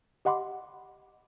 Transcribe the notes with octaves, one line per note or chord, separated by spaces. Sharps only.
G4 D#5 F#5 B5 C6 D6